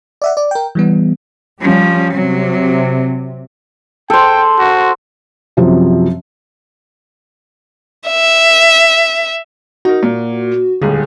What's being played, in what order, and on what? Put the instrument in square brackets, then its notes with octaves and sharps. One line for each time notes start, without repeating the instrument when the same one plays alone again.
[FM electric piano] D5 E5 F#5
D5
A#4 G5
E3 G3 B3
[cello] F3 [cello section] G3 C#4
[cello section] C3 [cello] F#3
[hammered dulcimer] A4 C5 [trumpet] G5
[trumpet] F#4
[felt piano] F#2 C3 F3 F#3
[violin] E5
[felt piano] D#4 A#4 [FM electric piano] F#4
[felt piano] A#2
[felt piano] D#1 C#2 G#4 [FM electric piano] D3